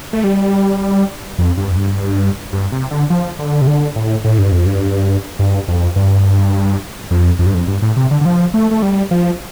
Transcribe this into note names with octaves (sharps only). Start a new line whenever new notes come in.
A3
G3
F2
G2
F2
G2
G2
C3
D3
F3
D3
C3
D3
A2
A2
G2
F2
G2
G2
F2
G2
F2
F2
G2
F2
G2
A2
C3
D3
D3
F3
A3
A3
G3
F3